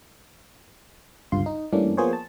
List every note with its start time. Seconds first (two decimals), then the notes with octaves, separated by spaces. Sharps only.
1.32 G1 C#2 G2 F4 C6
1.46 D#4
1.73 G2 E3 A3 A#3 C#4 D4
1.97 F3 A#3 B3 G#4 C5 C#5
2.13 A5